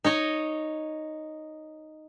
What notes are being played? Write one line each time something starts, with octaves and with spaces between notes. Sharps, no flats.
D#4 C#5 D#5